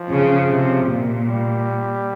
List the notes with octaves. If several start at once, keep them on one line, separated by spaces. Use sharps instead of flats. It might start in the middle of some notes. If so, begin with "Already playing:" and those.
Already playing: F3
C#3
C3
A#2
G3